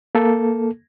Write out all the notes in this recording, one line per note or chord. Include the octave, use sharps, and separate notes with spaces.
A#3 A4